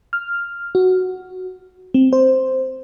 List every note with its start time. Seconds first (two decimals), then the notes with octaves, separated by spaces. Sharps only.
0.13 F6
0.75 F#4
1.94 C4
2.13 C5